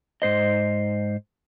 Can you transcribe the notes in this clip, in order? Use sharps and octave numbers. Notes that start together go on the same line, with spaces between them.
G#2 C5 D#5